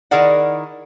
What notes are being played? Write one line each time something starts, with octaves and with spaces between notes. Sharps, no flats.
D#3 E4 G#4 A#4 D5 F#5